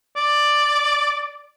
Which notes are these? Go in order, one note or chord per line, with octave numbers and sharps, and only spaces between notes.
D5